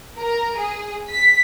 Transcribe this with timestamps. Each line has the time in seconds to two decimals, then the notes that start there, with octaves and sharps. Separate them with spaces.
0.18 A#4
0.57 G#4
1.09 B6